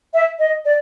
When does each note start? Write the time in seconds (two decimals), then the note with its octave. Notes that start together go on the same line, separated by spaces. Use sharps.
0.13 E5
0.39 D#5
0.65 D5